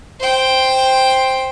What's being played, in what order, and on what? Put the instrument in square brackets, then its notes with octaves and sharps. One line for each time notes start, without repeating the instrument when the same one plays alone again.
[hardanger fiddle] C5 G5